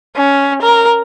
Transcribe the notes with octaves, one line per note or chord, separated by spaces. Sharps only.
C#4
A#4